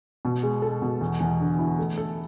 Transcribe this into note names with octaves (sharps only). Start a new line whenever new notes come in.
B2
G#3
A4
B2
E2
E2
D3
E4
A3
A4